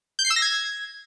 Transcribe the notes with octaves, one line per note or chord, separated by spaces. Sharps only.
G6
C7
E6
A#6
G#6